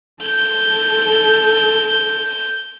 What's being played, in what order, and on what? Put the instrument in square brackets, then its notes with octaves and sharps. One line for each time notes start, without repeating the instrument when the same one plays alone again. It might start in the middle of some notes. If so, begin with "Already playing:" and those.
[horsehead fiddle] A4 [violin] G6